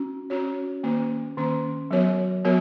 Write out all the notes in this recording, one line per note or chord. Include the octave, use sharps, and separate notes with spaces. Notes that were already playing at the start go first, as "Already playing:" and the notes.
Already playing: C#4 F#4
C#4 F#4 C#5
D#3 A#3 C#4
D#3 A#3 C#4
F#3 B3 F#4 A#4 C#5
F#3 B3 F#4 A#4 C#5